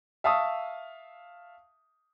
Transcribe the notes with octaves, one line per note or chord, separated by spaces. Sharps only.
E5 F5 A5 C#6 D#6